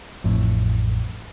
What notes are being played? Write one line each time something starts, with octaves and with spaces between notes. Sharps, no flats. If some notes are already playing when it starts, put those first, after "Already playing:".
A1 F2 A2